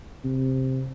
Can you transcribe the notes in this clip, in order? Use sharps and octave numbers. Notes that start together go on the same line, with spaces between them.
C3